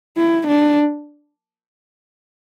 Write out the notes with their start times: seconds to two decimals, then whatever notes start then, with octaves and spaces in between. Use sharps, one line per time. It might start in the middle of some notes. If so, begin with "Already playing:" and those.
0.17 E4
0.47 D4